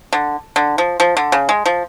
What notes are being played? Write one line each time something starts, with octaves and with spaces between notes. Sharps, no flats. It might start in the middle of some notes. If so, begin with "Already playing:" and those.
D3
D3
F3
F3
D3
C#3
G#3
F3